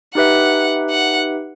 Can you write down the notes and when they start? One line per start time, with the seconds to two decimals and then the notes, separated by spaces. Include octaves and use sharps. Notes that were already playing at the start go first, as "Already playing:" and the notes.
0.15 D#4 G4 B4 E5 F#5
0.90 F#5